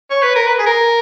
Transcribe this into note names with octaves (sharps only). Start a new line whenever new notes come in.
C#5
B4
A#4
B4
G#4
A#4